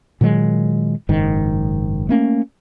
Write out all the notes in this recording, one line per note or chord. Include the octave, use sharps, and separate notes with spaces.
A#2 D#3 F#3 G#3
F#1 G#2 D#3
A3 A#3 C#4